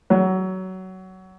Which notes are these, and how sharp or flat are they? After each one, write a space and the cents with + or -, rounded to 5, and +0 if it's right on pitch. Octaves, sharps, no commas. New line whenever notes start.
F#3 +20